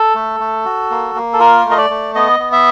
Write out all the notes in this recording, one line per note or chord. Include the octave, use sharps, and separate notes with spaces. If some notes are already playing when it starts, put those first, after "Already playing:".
Already playing: A4
A3
A3
F#4
A#3
A#3
A4
F4 A#4
A3
D#5
D5
A3
B3 D#5
B3
E5